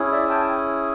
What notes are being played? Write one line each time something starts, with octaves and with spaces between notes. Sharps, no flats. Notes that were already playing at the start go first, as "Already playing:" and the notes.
Already playing: C#4 E4 G#4
D5 E5
G5 A5